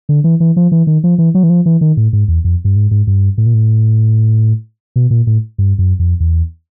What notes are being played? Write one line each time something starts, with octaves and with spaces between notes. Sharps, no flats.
D3
E3
E3
F3
E3
D#3
F3
E3
F#3
E3
F3
E3
D#3
A2
G#2
E2
F2
G2
G#2
G#2
G2
A2
A#2
A2
B2
A#2
A2
G2
F#2
F2
E2